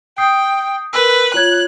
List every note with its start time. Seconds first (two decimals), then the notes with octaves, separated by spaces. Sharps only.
0.18 G5 D#6 G6 C7
0.93 A#4 B4 E6
1.34 F4 C#5 F#6 G#6